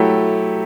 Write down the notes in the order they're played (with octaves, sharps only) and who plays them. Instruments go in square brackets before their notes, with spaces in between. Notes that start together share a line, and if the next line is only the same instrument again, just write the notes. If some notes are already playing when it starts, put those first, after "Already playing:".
Already playing: [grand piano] F#3 A3 E4 G4